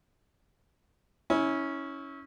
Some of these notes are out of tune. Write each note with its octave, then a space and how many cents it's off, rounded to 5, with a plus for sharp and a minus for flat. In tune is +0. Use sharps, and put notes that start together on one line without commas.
C#4 +0 E4 -30